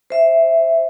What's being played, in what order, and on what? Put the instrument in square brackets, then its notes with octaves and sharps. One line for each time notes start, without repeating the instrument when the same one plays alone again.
[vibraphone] C5 E5